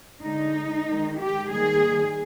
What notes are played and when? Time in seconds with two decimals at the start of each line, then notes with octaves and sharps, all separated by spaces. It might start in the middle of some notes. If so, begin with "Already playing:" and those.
0.22 D3 G#3 D#4
0.86 D#3 G#3
1.19 G4
1.50 D#3 G3 A#3 G#4